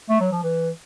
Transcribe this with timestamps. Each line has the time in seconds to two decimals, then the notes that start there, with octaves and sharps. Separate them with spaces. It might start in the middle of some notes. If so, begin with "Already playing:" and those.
0.09 A3
0.20 F#3
0.32 F3
0.43 E3